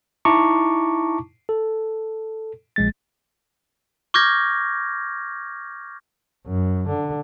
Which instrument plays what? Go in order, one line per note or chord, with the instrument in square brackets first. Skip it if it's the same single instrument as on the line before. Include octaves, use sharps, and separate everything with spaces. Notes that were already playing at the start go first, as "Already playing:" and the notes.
[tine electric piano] D#4 E4 A5 A#5 C#6 D6
A4
A#1 G#3 A6
[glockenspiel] C#6 D6 F6 G6 G#6 A#6
[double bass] F#2
D3